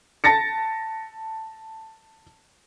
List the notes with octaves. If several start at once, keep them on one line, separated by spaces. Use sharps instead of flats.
A5 A6 A#6 C#7